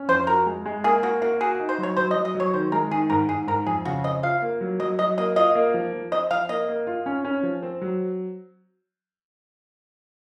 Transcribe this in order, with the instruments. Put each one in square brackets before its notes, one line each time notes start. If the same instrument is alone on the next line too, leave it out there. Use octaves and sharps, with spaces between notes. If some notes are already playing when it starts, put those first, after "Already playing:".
Already playing: [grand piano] C#4
[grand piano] F2 [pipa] C5
[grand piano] F#4 [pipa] A#4
[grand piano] G#3
G#3
[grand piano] A#3 [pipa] G#4
[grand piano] A#3 [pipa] F#4
[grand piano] A#3 [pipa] F#4
[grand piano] F#4 [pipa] G#4
[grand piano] D#4
[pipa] C5
[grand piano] F#3
[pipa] C#5
[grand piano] F#3 [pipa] C5
[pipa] D#5
[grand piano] F#3
[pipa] D#5
[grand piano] F#3 [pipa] C#5
[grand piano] D#3 [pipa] C5
[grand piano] G#3 [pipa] A#4
[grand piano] D#3 [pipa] G#4
[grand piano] G#2 [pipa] A#4
[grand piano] G#2 [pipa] G#4
[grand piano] G#2 [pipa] A#4
[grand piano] F2 [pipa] G#4
[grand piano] C#3 [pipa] F#4
[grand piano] C4 [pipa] D#5
[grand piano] F4 [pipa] F5
[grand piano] A#3
F#3
[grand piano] F#3 [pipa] D#5
[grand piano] F#3 [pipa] D#5
[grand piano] A#3 [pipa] D#5
[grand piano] F4 [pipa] D#5
[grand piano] A#3
F3
F3
[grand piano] C4 [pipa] D#5
[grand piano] F3 [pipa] F5
[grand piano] A#3 [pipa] D#5
[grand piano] A#3
F4
C#4
C#4
F3
C4
F#3